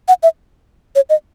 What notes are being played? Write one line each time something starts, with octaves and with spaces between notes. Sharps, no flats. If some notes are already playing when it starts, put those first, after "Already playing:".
F#5
E5
C#5
D#5